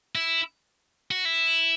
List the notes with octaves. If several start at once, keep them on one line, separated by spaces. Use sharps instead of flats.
E4
F#4
E4